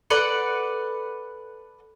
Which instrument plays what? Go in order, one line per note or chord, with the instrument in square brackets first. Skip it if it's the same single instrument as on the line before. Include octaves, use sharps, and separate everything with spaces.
[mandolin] A4 B4 D5 F#5